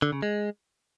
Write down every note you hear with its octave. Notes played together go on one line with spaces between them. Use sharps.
D3
C#3
G#3